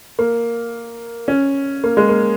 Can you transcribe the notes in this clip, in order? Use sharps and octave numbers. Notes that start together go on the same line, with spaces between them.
A#3
C#4
A#3
G#3
A#3